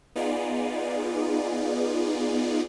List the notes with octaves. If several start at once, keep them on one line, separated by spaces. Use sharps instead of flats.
B3 D#4 F4 G#4 D5